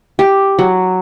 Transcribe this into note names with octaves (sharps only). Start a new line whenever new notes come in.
G4
F#3